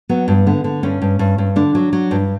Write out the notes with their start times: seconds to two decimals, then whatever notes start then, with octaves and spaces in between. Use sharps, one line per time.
0.09 F#3 B3
0.28 G2
0.46 D3 B3
0.64 D3
0.83 G2 C#4
1.02 G2
1.19 G2
1.38 G2
1.56 D3 D4
1.75 F#3
1.93 F#3
2.11 G2